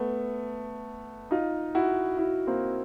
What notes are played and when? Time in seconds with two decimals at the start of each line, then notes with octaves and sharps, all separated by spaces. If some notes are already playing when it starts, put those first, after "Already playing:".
Already playing: A3 B3
1.31 D#4 F4
1.75 E4 F#4
2.18 E4 F#4
2.47 A#3 C4